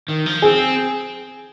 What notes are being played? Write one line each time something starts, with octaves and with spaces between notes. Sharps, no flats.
D#3
F3
C4 G#4